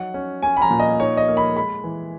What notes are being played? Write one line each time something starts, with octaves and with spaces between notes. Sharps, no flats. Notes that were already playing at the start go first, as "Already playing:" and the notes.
Already playing: F#3 D#4 F#5
C#4
C#4 G#5
B5
A#5
A#2
D#5
D#4 C#5
D#5
A#3
B5
G#3 B5
E3